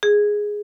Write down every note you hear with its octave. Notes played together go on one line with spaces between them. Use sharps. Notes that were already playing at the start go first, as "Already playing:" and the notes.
G#4